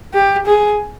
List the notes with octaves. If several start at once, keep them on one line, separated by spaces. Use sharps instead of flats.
G4
G#4